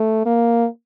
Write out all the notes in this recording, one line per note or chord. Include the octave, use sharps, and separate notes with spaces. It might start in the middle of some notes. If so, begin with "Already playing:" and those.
Already playing: A3
A#3